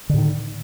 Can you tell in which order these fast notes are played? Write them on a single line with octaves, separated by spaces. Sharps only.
D3 A2 D#3